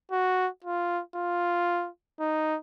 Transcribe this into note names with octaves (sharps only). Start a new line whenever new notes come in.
F#4
F4
F4
D#4